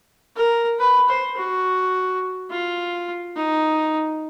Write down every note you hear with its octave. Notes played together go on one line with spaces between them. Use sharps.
A#4
B4
C5
F#4
F4
D#4